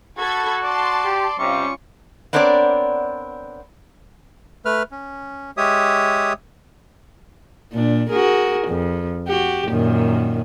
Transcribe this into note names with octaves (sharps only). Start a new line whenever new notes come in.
F#4 A4 B5 G#6
D5 A5 C6
G4
C3 G3 C#4 F4 C#6
B3 C4 D4 A#4 C#5 D5
A3 B4 F6
C#4
G#3 G4 C#5 E5 D#6
A#2 D4
F#4 G#4 A#4
F2
F#4 G4
F#2 A#2 D#3